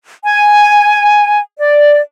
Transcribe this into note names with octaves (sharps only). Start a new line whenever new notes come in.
G#5
D5